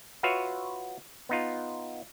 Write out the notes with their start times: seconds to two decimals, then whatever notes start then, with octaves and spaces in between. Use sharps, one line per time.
0.23 F4 F#4 B4 C#5 E5 F5
1.29 B3 D#4 F4